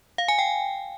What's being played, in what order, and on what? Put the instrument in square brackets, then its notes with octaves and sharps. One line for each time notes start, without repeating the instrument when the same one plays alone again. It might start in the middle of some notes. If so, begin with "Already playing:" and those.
[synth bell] F5
G#5
G5